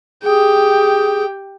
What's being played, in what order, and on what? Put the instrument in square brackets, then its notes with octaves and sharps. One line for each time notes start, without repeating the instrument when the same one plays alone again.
[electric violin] G4 G5 [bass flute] G#4